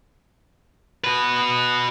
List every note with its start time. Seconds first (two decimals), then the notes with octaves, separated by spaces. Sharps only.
1.04 F#4 B4